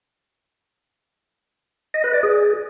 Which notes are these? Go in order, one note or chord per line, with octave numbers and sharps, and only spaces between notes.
D#5
B4
D5
G#4